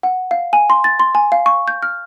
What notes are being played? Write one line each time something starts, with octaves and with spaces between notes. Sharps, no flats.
F#5
F5
G#5
C6
A6
C6
G#5
F5
C#6
G6
F6